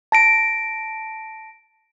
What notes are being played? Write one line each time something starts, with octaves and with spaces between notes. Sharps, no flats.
A5 A#6 D7